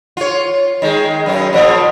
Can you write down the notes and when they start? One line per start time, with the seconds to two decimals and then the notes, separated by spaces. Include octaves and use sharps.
0.17 F4 C#5
0.82 D#3 G#3
1.26 F#2 C#4
1.53 A#2 C#3 F3